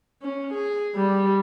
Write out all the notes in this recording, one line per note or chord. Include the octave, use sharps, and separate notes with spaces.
C#4
G#4
G3